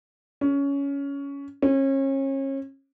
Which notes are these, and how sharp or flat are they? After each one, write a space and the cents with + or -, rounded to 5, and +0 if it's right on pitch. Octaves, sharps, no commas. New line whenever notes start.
C#4 +15
C#4 -35